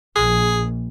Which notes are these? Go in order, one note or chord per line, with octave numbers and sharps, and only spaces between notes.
A#1 G#4